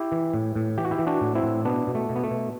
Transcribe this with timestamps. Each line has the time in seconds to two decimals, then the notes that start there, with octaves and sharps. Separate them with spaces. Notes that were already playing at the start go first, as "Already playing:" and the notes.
Already playing: E4 G4
0.12 E3
0.34 A2
0.55 A2
0.78 E3 G4
0.85 F#4
0.91 E4 G4
0.99 E3
1.07 D4 F#4
1.21 A2
1.35 C4 E4
1.43 A2
1.65 B2 B3 D4
1.87 B2
1.95 A3
2.09 B2
2.16 B3
2.24 A3
2.31 B2